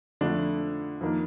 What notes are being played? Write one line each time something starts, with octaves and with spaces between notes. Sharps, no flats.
F2 D3 F3 A3 D4
F2 D#3 A#3